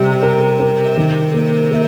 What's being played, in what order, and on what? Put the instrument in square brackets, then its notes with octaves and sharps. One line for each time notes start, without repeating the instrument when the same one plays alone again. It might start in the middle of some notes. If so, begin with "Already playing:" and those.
Already playing: [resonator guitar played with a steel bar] C3 [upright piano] G3
[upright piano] A#4
A#4
D#3
A#3
A#3